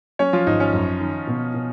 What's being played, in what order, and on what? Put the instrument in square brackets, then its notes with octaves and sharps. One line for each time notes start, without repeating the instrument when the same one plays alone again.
[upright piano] F#3 [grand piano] C#4 C#5
[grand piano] F3 F4
[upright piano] G#1 [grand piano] D#4
[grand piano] C#4
[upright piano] F#2
D#3
B2
B2